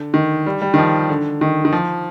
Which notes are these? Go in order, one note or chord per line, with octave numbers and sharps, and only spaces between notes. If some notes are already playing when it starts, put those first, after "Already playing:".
Already playing: D3
D#3
G3
G3
D#3
F3
D3
D#3
D#3
F3